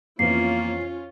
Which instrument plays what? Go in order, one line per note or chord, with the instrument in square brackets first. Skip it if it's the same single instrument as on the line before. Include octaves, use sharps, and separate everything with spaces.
[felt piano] F2 E3 B3 [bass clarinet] A#3 [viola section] C#4 F4 [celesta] C7